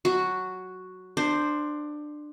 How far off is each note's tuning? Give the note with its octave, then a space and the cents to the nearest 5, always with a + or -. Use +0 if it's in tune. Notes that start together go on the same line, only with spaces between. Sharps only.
F#3 +0 F#4 +0
D4 +20 C5 +0 G5 +0